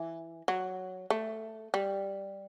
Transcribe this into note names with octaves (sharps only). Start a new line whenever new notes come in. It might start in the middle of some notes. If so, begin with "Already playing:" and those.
Already playing: E3
F#3
A3
G3